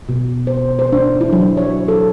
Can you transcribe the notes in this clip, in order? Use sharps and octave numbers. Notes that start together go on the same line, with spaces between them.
B2
C5
C5
D4
E4
F#3
C#5
A4